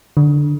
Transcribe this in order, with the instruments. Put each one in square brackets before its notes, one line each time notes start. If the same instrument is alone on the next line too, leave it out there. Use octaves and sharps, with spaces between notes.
[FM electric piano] D3